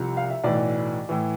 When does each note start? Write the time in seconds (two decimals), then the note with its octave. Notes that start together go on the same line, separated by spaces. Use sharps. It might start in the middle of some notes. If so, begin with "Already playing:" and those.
Already playing: C2 C3 F3
0.17 F5
0.30 E5
0.44 B1 A2 E3 D5
1.09 A2 E3